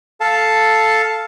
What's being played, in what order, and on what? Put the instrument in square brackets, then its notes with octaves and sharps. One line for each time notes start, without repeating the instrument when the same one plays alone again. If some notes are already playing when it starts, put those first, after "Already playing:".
[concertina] A4 F5 A5